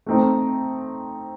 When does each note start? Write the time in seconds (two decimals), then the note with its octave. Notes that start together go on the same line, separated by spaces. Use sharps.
0.06 A3 C4 D#4